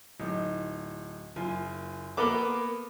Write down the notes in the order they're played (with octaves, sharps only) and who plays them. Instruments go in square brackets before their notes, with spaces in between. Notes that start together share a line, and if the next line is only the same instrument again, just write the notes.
[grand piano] D1 D#4
F#1 F4 G#5
[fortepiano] A#3 B3 D6 [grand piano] A4 G7